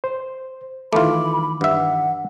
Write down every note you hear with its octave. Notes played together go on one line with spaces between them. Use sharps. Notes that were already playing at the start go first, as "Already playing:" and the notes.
C5
D#3 E3 A3 F4 B5 D6
G2 E5 F#5